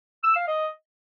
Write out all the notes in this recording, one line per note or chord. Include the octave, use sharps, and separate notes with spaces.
E6
F5
D#5